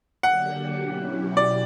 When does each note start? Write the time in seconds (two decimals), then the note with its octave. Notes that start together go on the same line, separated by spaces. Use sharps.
0.22 D3 F#3 A#3 D4 G4 F#5
0.80 B2 F#3 C#4 E4 G4
1.37 D5